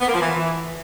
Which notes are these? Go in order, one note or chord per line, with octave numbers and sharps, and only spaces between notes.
B3
A#3
F3
E3